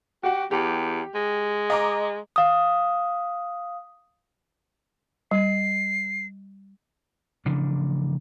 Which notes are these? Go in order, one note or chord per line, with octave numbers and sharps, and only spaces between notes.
F#4 G4 F#5
E2 G4
G#3
D#5 A#5 D6
F5 D#6
G3 C7
A1 C#3 F3 D4